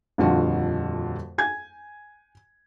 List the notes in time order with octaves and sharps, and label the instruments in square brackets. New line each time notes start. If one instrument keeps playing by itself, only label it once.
[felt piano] D#1 F2 D3 F4 F#4 A5
G#5 G#6